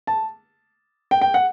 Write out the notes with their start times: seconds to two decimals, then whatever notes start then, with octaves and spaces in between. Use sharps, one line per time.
0.07 A5
1.11 G5
1.21 G5
1.34 F#5